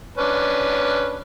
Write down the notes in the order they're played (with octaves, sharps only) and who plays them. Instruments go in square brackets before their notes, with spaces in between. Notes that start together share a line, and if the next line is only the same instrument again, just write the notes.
[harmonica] C#4 D4 B4